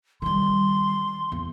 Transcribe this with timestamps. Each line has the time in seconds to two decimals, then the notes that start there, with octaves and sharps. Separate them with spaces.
0.22 D#3 G3 C6
1.32 E2